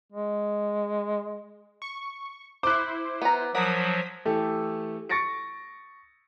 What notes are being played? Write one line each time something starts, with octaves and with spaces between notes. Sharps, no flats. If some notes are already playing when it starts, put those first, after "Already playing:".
G#3
C#6
E4 C5 D6 F#6
B3 A#5
F3 F#3 A#4 F#5 D#6 B6
E3 A3 G4 A4
C#6 A6 A#6 C#7 D7